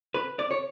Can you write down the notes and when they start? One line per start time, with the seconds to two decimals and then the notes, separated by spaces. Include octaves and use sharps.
0.14 B4
0.39 D5
0.51 C#5